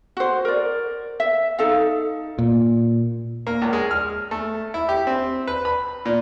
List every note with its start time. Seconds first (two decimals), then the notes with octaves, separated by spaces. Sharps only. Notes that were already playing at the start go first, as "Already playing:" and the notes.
0.17 F#4 C5
0.45 A#4 D5
1.20 E5
1.59 D#4 A4 F5
2.39 A#2
3.47 A#3
3.62 C#2
3.73 G#3
3.91 F6
4.31 A3
4.74 E4
4.89 G4
5.07 C4
5.47 B4
5.65 B5
6.06 A#2